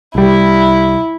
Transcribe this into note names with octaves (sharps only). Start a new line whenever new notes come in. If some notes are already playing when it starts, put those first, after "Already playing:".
C2 G3 E4